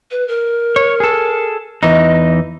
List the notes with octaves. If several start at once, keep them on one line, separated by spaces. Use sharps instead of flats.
B4
A#4
C#5
G#4 A4
E2 E3 D#4 D#5